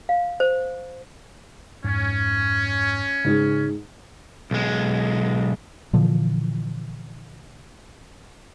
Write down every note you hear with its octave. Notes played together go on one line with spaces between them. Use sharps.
F5
C5
F2 G#2 C#4
G#2 C#3 G#3 D#4 G#4
B1 G#3
A#2 D3 E3 F3